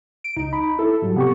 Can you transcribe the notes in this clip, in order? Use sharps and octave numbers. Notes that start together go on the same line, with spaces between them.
D7
C#2 D#4
B5
E4 A4
G#2 F#3 G3
C3 B3 G4 C#6